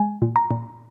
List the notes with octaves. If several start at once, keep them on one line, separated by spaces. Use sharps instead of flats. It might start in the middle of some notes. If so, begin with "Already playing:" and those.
Already playing: G#3 G#5
A#2
A#5
A#2